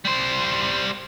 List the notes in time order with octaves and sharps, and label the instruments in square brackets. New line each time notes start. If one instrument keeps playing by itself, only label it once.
[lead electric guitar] G3 C5